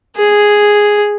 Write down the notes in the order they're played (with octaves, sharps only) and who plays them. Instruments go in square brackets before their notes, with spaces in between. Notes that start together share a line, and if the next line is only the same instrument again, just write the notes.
[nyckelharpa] G#4